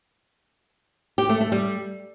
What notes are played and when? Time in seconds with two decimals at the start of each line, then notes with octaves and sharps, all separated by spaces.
1.18 G4
1.29 A3
1.41 A3
1.52 G3